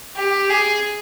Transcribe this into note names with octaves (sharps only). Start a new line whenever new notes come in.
G4
G#4